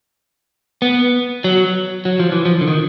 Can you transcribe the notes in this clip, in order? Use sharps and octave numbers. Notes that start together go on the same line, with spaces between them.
B3
F#3
F#3
F3
E3
F3
D3
D#3